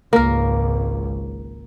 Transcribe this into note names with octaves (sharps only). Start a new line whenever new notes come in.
G#1 C#2 A#3 A#4